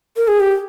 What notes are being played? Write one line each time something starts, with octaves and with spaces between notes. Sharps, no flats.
A#4
G#4
G4